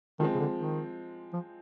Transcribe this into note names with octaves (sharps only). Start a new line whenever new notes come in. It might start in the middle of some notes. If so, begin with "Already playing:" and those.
D#3 F3 G#3 C4
C#3
D3
D#3
F3